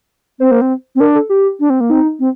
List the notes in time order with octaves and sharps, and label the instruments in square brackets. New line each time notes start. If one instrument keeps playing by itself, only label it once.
[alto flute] C4 [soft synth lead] C5
[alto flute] A#3
C4
C4
[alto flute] D4 [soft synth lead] A#4
[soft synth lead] A4
G4
[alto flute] D4
C4
A#3
[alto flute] C4 [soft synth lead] D#4
[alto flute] C4